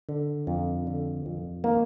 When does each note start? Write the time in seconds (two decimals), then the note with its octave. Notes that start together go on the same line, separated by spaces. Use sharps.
0.09 D3
0.47 F2
0.87 D3
1.26 F2
1.64 D#3 A#3